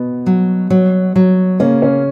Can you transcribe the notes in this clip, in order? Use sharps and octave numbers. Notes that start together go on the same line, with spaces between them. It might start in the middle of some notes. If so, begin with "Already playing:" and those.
Already playing: B2 B3
F#3
F#3
F#3
C#3 A#3 C#4
C#3 C#4